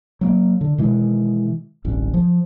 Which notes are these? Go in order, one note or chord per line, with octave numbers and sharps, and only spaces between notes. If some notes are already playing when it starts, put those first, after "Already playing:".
F#3 A3 A#3
D3
B2 D#3 E3 G#3
D1 A1 G2
F3